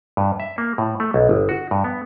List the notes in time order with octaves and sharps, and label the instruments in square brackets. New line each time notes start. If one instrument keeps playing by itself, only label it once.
[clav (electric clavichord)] G2
E5
A#3
A2
A3
B1
G1
F#4
G2
B3